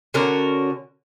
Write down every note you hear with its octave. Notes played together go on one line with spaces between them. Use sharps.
D3 C#4 F#4 A#4